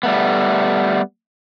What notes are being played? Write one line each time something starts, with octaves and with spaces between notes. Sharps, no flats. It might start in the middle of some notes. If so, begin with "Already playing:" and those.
G3 A3 B3